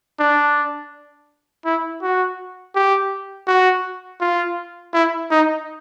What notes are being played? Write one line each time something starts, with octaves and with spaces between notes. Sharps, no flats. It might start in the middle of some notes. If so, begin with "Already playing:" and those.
D4
E4
F#4
G4
F#4
F4
E4
D#4